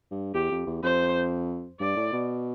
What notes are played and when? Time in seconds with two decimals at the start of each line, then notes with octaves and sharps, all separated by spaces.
0.11 G2
0.34 E2 G4
0.51 F2
0.67 E2
0.83 F2 C5
1.80 G2 D5
1.96 A2
2.12 B2